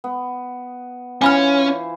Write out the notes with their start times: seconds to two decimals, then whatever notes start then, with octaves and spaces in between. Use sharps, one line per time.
0.04 B3
1.22 E3 C#4 F4 C5 G#5 B5 F6